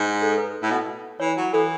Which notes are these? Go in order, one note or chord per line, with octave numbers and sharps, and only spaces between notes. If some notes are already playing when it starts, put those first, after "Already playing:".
Already playing: G#2
A4
A4
B4
A2
B2
E3 C#5
F#3
E3 A4